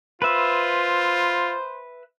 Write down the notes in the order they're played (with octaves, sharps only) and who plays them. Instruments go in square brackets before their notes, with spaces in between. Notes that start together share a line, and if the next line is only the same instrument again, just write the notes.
[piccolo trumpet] F4 [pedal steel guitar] B4 E5 [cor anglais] C5